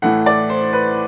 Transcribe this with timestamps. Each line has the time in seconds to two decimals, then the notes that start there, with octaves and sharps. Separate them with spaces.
0.02 A2 E3 A3 F#5
0.26 D5
0.49 C5
0.73 B4